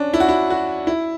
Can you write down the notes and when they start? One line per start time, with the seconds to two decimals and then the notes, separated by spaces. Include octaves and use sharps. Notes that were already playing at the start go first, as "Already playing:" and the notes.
Already playing: C#4 D4
0.14 E4
0.20 F#4
0.29 E4
0.50 F#4
0.87 E4